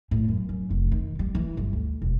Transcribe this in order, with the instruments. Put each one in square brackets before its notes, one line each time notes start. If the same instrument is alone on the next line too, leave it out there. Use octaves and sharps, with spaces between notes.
[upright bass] A2
F#2
F#2
F1
D#3
G3
E3
G1
D2
E1